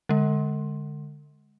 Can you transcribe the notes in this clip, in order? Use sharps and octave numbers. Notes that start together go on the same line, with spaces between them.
D3 G#3